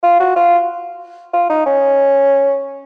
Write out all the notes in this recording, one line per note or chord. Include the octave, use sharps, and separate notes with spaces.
F4
F#4
F4
F4
D#4
C#4